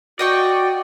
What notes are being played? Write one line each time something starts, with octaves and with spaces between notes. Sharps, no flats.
F#4 D5 D#5 G5 C#6